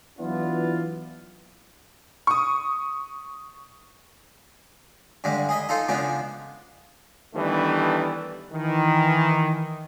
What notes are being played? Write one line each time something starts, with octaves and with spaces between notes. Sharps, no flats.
E3 F#3 B3 D4 E4 F4
C#6 D#6
G2 D3 G3 G#3
G#4 D#5 B5
D#4 F4 A4
C#3 F3 G#3 B3 D4
D#3 E3 G3 A3 B3 D4
D#3 E3